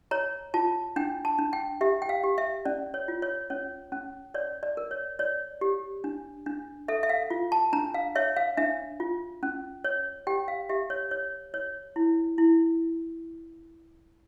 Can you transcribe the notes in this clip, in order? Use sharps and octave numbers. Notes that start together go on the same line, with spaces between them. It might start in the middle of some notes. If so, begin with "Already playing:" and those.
C#5 A#5
F4 A5
D4 G5
A5
D4
G5
G4 E5
G5
F5
G4
E5
C#4 D5
C#5
F4
C#5
C#4 C#5
C#4
C#5 D5
D5
A#4
C#5
C#5 D5
G4
D4
D4
A4 E5
E5
F5
F4
A5
D4 A#5
F5
C#5 E5
F5
D4 E5
F4
C#4
C#5
G4 G5
F5
G4 E5
C#5
C#5
C#5
E4
E4